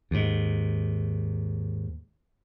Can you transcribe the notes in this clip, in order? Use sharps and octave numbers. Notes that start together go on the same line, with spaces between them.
D#2 G#2